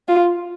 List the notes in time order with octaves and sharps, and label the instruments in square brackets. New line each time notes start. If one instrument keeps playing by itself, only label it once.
[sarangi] F4